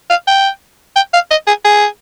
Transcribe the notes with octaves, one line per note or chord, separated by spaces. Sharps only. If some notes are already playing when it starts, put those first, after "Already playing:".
F5
G5
G5
F5
D#5
G#4
G#4